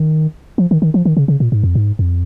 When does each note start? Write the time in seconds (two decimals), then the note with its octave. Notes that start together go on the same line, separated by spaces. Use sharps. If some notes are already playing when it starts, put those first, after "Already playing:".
Already playing: D#3
0.58 F3
0.71 D#3
0.82 D#3
0.94 F3
1.05 D#3
1.17 C#3
1.28 C#3
1.40 A#2
1.52 G#2
1.64 F2
1.75 G#2
1.99 F2